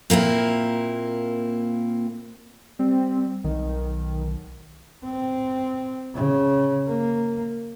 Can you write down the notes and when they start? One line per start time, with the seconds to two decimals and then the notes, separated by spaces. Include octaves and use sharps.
0.10 A#2 A#3 C4 E4
2.79 G3 C4
3.44 B1 D#3
5.04 C4
6.14 C#3
6.88 A#3